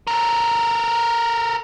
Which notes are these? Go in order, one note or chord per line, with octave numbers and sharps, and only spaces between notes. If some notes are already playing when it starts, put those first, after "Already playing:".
A4 A#4